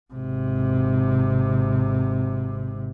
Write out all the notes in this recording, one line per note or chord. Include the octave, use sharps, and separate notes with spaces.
G#1 C3